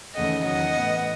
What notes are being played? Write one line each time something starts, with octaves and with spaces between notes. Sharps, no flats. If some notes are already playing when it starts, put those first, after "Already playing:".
D#2 C#3 E3 A3 D#5 F#5
E2 D#3 F#3 D#5 F#5
A2 E3 B3